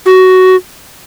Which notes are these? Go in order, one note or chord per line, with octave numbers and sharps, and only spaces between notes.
F#4